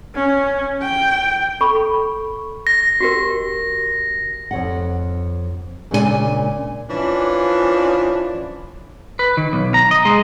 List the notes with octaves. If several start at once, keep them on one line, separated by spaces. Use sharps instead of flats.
C#4
G5
A4 B5 C#6
A#6
F#4 G4 A#4
F2 C#5 F#5
A#2 C#3 G#3 D4 G#4 G#5
E3 F3 C#4 D4
B4
D#3
B1
A#5
D#5
G#3